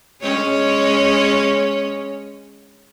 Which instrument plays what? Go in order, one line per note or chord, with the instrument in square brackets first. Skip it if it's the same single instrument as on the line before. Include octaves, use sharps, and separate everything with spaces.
[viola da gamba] G#3 C#4 C#5